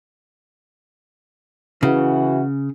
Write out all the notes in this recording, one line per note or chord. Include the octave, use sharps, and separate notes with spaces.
C#3 E3 F#4